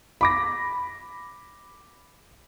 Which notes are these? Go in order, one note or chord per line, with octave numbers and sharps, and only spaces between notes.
B5 D6 A#6